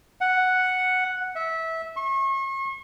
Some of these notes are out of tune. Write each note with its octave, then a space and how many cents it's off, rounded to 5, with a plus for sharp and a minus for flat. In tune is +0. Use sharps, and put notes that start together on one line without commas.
F#5 +0
E5 -20
C#6 -40